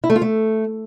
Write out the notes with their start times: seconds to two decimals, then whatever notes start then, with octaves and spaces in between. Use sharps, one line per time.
0.04 E4
0.10 A3
0.16 F4
0.22 A3